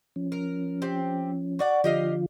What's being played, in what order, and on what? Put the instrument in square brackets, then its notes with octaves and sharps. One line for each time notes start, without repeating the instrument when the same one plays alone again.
[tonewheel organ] F3 C#4
[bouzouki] A#4
C4 G4
F#4 D5 F#5
[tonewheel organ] D3 F3 F4 [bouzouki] G4 D#5 F5